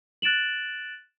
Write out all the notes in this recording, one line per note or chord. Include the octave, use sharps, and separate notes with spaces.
F#6 A6 D7 E7 F#7